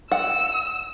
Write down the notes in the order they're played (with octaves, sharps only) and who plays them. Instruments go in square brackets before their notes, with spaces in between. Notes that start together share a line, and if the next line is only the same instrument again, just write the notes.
[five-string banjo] F#5 [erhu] E6